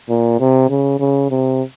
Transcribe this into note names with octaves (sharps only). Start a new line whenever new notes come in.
A#2
C3
C#3
C#3
C3